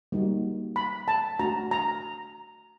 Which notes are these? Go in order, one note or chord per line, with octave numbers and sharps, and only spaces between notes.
G3 A#3 D#4 F#4
B5
A5
A3 D4 F#4 A#5
A#5